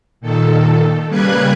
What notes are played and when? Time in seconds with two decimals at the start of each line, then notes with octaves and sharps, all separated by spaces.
0.21 A#2 D#3 A4
1.08 C#3 G3 A#3 B4 F#6 G#6